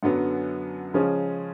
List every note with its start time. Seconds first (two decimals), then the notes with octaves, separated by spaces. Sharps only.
0.03 F#2 D3 F#3 B3
0.94 C#3 F3 G#3 C#4